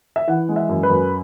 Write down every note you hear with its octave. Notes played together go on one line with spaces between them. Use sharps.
E5
E3 F#5
G#3
E5
F#2
B4
F#2